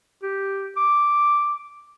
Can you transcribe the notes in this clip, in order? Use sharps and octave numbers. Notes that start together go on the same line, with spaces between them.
G4
D6